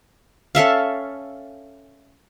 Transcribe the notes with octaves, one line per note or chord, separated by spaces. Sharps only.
C#4 A4 E5 F5